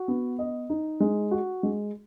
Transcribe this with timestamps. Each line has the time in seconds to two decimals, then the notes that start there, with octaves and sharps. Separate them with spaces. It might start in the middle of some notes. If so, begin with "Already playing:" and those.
Already playing: F#4
0.08 B3
0.39 D#5
0.70 D#4
1.00 G#3
1.31 F#4
1.63 G#3